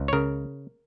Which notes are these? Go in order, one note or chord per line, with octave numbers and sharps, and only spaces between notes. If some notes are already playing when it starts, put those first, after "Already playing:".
Already playing: C#2
C#5
C#3 A#4